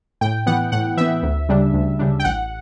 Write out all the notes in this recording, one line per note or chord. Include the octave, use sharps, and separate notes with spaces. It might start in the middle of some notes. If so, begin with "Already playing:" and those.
A2 G5
E3 B3 F#5
A2 F#5
E3 B3 E5
D2
C#3 G3 D4
D2
C#3 G3 D4
G5
A1 F#5